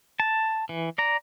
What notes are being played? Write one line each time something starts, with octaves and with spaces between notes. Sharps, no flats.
A5
E3
D5 A#5